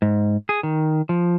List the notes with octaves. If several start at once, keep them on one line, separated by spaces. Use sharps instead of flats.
G#2
G#4
D#3
F3